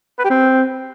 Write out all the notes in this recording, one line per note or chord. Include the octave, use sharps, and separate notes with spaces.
B4
G4
C4